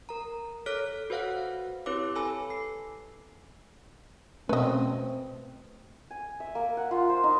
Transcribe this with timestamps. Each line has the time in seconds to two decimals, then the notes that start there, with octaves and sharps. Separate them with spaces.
0.09 A#4 A#5
0.66 A4 C#5 F6 F#6 B6 D7
1.10 F#4 B4 C5 F5 F#5 F#6
1.86 C4 E4 G4 B4 C#5 D6
2.15 A4 G#5 A5 B5 E6
2.50 C7
4.49 B2 A3 C4 C#4 B4 D#5
6.11 G#5
6.40 E5
6.55 A#3
6.77 F#5
6.91 F4
7.10 C5
7.24 D#4